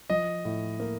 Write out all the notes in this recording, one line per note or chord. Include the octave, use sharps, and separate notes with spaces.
F3 D#5
A2
A#3